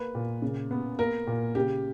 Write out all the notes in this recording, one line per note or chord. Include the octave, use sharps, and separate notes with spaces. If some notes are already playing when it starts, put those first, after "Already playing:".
Already playing: A#3 B4
A#2
C#3
B3
A#3 A#4
A#2
C#3 G4